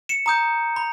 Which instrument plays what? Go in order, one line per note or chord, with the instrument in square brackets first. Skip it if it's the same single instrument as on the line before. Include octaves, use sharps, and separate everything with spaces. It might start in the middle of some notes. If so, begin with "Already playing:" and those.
[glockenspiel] C#7 E7
A#5 D#6 G6
B5